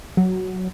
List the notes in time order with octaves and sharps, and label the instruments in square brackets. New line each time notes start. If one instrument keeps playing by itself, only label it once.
[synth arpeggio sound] F#3